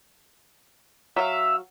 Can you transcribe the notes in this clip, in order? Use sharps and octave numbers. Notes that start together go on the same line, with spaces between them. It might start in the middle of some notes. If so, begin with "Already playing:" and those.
F#3 E5 F5